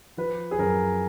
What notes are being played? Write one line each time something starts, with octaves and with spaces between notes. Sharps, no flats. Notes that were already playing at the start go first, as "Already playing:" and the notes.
F3 B4
G#4
F#2 A#4